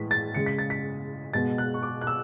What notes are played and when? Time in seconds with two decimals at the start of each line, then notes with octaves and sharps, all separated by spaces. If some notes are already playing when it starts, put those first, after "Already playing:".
Already playing: A2 E3 G#3 B6
0.11 A6
0.35 C#3 G#3 C#7
0.46 B6
0.58 A6
0.70 B6
1.33 B2 G#3 A6
1.58 F#6
1.74 C#6
1.83 D6
2.01 F#6
2.07 E6